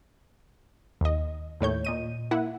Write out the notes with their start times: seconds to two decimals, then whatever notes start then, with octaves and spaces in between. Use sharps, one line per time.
1.01 D#2 D#5
1.61 D#2 A2 C#5 G6
1.85 A#2 D#5 D#7
2.31 A#3 E4 F#5